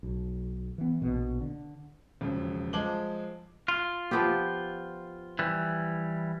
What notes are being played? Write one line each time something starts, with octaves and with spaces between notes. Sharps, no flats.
B1
E3 B3
A#1 B2
D3
E1 F2 C#3
F3 G#3 A5 D6 F#7 G7
F4
F3 B3 G4
E3 G3